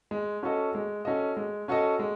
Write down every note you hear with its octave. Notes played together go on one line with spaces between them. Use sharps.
G#3
C#4 F#4 A4 D#5
G#3
C#4 F#4 A4 D#5
G#3
C#4 F#4 A4 D#5
G#3